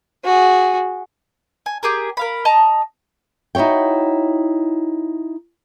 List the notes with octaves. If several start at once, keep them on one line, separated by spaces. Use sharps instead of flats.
F#4 G#4
G#5
G4 G#4 A#4
A#4 F5 B5
D#5 A5 A#5
D#4 E4 F#4 C#5 G5